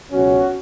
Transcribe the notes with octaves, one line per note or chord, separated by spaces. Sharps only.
C#2 B2 F#3 C#4 F#4